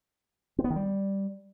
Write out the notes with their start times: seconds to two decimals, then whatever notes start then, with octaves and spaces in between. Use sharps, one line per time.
0.59 C4
0.64 B3
0.70 D#3
0.76 G3